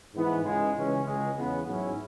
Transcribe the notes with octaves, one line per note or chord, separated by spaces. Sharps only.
G#2 E3 B3
C#2 C#3 G#3
C#2 C#3 E3 G#3 C#4
C#2 C#3 G#3
E2 C#3 E3 B3
G#2 F#3 C#4 E4